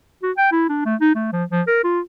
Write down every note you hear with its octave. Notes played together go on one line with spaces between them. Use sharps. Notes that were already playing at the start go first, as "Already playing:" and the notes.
F#4
G5
E4
D4
A3
D#4
A3
F3
F3
A#4
F4